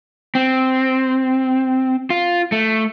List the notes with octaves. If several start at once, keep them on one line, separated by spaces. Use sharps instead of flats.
C4
F4
A3